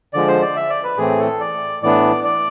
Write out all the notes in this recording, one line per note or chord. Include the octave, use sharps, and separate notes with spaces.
D3 F3 G#3 D5
C5
D5
E5
D5
B4
A2 E3 A3 C4 G#4
A4
D5
A2 E3 B3 D4 D5
D5